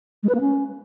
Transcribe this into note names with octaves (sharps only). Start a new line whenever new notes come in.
G#3
B4
A#3
C#4